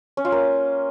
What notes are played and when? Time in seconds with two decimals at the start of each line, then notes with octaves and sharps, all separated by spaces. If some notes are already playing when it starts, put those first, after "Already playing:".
0.17 C#4
0.25 F4
0.32 A#3